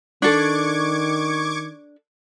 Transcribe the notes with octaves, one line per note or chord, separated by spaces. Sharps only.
D#3 D4 A4 C#6 D6 G#6